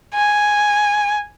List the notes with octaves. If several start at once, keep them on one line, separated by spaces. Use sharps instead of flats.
G#5